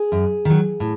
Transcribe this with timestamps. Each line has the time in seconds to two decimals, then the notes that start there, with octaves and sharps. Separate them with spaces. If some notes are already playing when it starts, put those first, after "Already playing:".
Already playing: G#4
0.12 F#2
0.45 D#3 F#3
0.80 A2